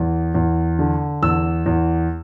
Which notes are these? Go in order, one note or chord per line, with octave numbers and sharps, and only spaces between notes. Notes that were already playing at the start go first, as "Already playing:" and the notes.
Already playing: E2
E2
D3
E2 E6
E2